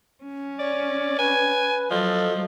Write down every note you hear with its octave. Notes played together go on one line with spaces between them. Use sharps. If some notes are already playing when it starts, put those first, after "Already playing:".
C#4
C#5 D5
B4 G#5
F3 F#3 A4 D#5